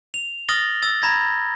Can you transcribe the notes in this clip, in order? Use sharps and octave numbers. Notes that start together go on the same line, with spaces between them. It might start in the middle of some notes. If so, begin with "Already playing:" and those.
F7
D#6 F6 A6 A#6 F#7 G7
E6 A6
A#5 B5 G#6 A#6